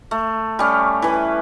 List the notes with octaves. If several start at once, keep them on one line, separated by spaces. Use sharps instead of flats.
A3
G3 C#4
E3 B4